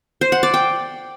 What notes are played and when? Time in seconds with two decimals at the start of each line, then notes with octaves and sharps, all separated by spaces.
0.21 C5
0.32 F#5
0.43 D5
0.54 G5